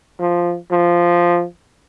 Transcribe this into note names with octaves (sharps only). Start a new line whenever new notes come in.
F3
F3